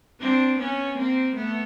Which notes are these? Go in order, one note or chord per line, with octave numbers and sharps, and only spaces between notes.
C4 D4
B3 C#4
A#3 C4
A3 B3